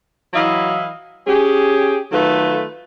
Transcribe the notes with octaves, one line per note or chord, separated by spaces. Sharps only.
E3 F#3 E4 D#5 F5
C#4 G4 G#4
D#3 F#3 A3 F4 A4 B4